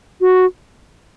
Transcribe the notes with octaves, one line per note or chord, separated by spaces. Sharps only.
F#4